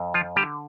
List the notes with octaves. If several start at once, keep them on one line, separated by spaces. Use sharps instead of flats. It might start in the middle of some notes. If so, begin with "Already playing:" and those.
Already playing: F2
F3 F4
D3 G3 G4